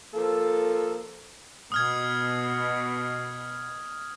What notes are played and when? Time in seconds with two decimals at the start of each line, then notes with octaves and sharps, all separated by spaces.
0.14 F3 A#3 A4
1.72 B2 D#6 F6 G#6